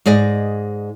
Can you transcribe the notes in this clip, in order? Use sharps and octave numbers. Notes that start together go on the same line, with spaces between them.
G#2 G#4 D5 D#5